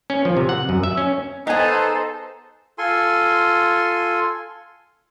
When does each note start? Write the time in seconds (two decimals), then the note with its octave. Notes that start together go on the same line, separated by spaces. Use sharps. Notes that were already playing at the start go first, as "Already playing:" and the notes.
0.10 C#4
0.25 F3
0.37 C3
0.49 F#5
0.69 F#2
0.83 E5
0.97 C#4
1.47 B3 D#4 G#4 A4 C5 D#5 G#5 A5
2.78 F4 A4 G#5 C6